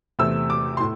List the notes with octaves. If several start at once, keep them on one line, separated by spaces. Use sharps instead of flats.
E2 C3 A3 C4 E6
D6
C6
A2